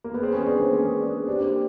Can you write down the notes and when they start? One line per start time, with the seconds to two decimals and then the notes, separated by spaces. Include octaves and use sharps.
0.04 A#3
0.14 B3
0.20 C4 G#4
0.33 B3 C#4
0.46 C4 D4
0.60 A#3 C4
0.73 B3 C#4
1.00 C4 D4
1.27 C4 D4 G4
1.40 A#3 C4